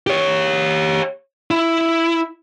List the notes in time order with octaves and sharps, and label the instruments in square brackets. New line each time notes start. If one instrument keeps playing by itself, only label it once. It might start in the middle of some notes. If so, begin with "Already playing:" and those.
[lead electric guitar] G4 C#5
E4